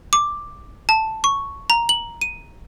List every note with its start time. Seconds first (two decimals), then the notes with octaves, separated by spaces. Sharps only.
0.13 D6
0.89 A5
1.24 C#6
1.70 A#5
1.89 F#7
2.21 D#7